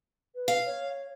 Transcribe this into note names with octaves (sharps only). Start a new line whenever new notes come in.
B4
F5
C#5